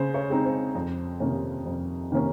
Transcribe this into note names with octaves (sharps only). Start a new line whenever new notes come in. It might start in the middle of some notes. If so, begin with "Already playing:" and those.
Already playing: C#3 C5
C#5
G#3 C4 D#4
C5
F2
C3 D#3 A#3 C#4
F2
C3 D#3 A#3 C#4